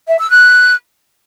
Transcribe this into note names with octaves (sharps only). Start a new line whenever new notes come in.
E5
E6
F#6